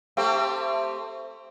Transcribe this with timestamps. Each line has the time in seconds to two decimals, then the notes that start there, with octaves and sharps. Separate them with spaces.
0.17 A3 C4 G4